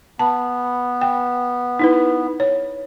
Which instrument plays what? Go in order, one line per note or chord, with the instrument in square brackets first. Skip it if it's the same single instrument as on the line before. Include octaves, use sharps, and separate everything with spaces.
[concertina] B3 [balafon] A5
[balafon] G5
D#4 E4 B4
C#5